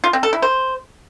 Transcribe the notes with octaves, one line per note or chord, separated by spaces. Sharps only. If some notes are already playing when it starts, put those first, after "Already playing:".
F4
C4
A4
E4
C5